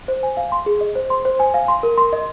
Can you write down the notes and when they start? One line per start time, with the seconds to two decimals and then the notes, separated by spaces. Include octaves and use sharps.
0.08 C5
0.23 G#5
0.37 F5
0.52 C6
0.66 G#4
0.81 D#5
0.95 C5
1.10 C6
1.25 C5
1.40 G#5
1.54 F5
1.68 C6
1.83 A#4
1.98 C6
2.13 D#5